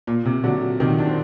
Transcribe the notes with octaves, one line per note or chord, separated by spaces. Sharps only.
A#2
C3
D3 F#3
C3 D#3
D4
C4